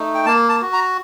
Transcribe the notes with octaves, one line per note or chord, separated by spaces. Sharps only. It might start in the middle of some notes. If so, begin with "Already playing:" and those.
Already playing: A3 D#4
G5
A#3 A5
A5
F#4
A#5